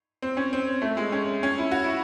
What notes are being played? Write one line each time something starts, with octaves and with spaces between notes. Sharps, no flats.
C4
C#4
C4
A3
G#3
C#4
C#4
E4
F#4
E4